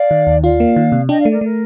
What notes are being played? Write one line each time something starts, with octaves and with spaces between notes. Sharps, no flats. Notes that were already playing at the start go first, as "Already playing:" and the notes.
Already playing: D5 F5
D#3
D#2
F4 D5 F5
A#3
D#3
C3
D4 D#5 G5
D5 F5
A3
A#4 D5
A3 A#4